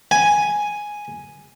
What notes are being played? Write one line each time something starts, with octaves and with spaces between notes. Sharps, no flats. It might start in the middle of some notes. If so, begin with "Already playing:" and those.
G#5